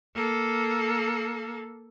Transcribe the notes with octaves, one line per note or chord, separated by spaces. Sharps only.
A#3 A4